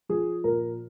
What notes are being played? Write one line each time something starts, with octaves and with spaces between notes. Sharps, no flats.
F3 G#4
A#2 A#4